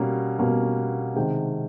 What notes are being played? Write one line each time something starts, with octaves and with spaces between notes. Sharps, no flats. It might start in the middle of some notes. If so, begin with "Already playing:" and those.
Already playing: B2 G3 A#3 C#4
B2 G3 A#3 C#4
C3 D#3 G#3 G5